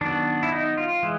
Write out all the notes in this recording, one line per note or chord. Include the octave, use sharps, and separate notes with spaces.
D#3 F#3 B3 D4
E4
D#4
F4
E3 G#3